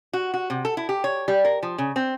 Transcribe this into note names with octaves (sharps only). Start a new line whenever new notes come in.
F#4
F#4
C3
A4
E4
G4
C#5
G3
A#4
F3
C#3
C4